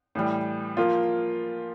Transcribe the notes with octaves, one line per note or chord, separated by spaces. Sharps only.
A2 E3 G3
F3 A#3 F4